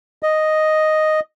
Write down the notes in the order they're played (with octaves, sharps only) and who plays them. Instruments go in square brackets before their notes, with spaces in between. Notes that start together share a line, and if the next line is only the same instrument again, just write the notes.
[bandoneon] D#5